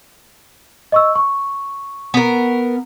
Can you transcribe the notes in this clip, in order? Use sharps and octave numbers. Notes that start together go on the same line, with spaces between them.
D#5 C#6 E6
C#6
B3 A#4